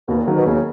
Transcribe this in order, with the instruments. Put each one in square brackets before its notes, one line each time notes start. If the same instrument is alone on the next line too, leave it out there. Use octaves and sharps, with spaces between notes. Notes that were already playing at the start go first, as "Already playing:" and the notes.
[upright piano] D#2 [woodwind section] B2
[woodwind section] A#2
[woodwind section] G#2 [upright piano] D#3 F#3
[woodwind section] B2
[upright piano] D#2 [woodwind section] C#3